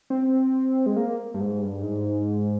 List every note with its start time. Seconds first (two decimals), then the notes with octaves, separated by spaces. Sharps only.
0.10 C4
0.86 G#3
0.97 A#3
1.34 G2
1.40 G#2
1.61 G2
1.83 G#2